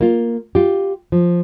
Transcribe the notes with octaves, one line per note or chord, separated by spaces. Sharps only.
A#3 F4
F4 G4
F3